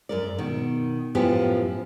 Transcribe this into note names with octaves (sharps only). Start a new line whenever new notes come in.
F#2 A#4 D5
B2 D#3
F#2 A2 F3 B3 G4 G#5